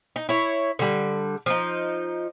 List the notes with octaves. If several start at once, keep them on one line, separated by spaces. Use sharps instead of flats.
D#4
E4 C#5
D3 G3
F3 D#4